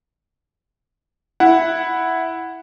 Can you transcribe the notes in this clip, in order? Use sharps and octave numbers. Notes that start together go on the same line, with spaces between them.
E4 F#5